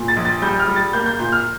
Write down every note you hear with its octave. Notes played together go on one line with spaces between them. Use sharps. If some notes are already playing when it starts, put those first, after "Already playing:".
Already playing: A#2
A6
A#1
A6
G3 G6
F6
G3
A6
A#3 G6
G6
A#2 G6
F6